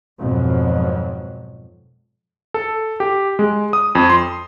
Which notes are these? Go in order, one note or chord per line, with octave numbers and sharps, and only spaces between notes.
F2 G#2 B2 F3 F#3
A4
G4
G#3
D#6
F2
C6